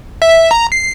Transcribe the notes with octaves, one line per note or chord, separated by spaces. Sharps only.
E5
A#5
C7